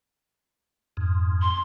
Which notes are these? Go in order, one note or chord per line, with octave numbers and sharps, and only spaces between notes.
F2 G#2
C6